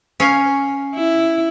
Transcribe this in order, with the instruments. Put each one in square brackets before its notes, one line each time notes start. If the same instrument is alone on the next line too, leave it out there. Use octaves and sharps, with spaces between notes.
[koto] C#4 F5 G#5
[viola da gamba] E4